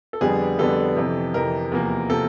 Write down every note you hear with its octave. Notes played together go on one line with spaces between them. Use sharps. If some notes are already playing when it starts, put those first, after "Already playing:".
A4
F2 D3 G3 B3 G#4
F2 D3 G3 B3 A4
F2 C3 E3
F2 C3 E3 A#4
E2 C3 F3 A#3
C3 F3 A#3 A4